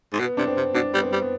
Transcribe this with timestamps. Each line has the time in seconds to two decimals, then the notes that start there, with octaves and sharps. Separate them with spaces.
0.13 G#2
0.20 B2 B3
0.37 C3 D4
0.47 C4
0.57 C3
0.74 B2 D4
0.94 G3 B3
1.02 C4
1.13 G3
1.22 B3